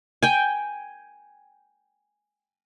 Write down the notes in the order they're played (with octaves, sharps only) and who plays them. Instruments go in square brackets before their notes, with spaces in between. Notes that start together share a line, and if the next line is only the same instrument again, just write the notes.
[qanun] G5 G#5